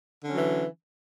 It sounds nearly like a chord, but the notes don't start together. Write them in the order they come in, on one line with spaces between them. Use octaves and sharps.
D3 C#4 F#3 E3